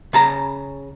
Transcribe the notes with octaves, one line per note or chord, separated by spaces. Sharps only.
C#3 A5 A#5